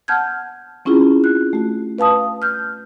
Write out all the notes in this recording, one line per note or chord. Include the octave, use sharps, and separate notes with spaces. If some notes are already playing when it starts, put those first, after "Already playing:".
F#5 A5 F6 G6 G#6
C4 C#4 E4 F4 G#4
F#6
A3 F#4
B4 F5 A5 D#6
F6 G6